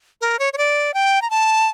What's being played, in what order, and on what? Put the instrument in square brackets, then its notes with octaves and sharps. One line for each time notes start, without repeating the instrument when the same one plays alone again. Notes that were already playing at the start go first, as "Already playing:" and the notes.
[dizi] A#4
C#5
C#5
D5
G5
A#5
A5